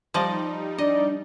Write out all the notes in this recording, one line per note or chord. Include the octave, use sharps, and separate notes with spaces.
F3 G3 D#4 D5 D#5
D4 D5 D#5